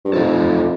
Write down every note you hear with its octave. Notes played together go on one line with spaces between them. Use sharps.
G2
F2 F3 A3 D#4 A4